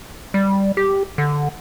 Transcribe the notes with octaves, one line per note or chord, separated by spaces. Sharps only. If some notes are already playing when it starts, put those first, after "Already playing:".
G3
G4
D3